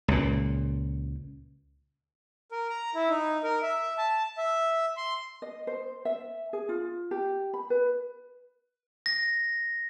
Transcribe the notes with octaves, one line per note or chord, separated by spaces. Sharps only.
C#2 A#2
A#4
A#5
E4
D#4
A#4
E5
A5
E5
C6
D#5
C5
E5
G#4
F4
G4
B5
B4
A#6